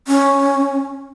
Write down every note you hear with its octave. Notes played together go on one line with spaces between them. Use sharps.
C#4